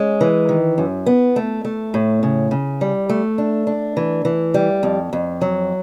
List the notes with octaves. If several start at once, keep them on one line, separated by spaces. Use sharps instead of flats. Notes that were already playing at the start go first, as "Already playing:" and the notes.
Already playing: G#3 C#4
E3
D#3
F#2
B3
A3
A3
A2
C#3
C#3
G3
A3
D4
D4
E3
E3
G3
F2
F2
F#3